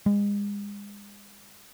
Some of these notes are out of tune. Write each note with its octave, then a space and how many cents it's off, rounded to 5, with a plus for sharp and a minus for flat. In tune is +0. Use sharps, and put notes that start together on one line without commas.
G#3 -35